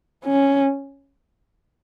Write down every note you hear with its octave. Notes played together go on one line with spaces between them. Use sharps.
C#4